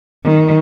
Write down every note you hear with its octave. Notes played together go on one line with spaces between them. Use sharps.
D#3